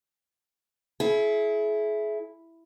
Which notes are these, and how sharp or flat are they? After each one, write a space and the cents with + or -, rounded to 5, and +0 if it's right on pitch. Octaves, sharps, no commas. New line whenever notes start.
E4 +0 G#4 +40